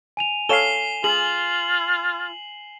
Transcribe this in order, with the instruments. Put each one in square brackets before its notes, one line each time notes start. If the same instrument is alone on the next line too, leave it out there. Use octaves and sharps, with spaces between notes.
[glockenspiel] G#5 D#7 F7
[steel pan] A4 C#5 F5 [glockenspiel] G#5 E7 [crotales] C7 G7
[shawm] F4 [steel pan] G#4 [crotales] F#7